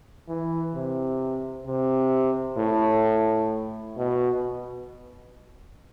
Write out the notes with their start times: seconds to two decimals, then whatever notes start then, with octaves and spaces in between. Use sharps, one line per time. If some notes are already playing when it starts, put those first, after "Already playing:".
0.28 E3
0.74 C3
1.66 C3
2.58 A2
3.97 B2